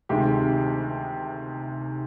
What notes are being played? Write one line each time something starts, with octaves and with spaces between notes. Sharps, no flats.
D2 C3 D#3 G#3 G4